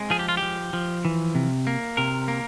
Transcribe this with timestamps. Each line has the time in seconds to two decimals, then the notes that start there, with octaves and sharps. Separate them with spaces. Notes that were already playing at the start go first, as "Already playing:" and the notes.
Already playing: G#3 C4
0.10 F3 G#4
0.19 G4
0.29 F4
0.37 F3 G4
0.73 F3
1.05 E3
1.35 C3
1.67 A#3
1.97 C3 A#4
2.28 A#3